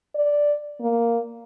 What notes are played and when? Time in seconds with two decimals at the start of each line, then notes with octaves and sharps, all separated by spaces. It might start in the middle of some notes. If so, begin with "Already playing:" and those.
0.15 D5
0.81 A#3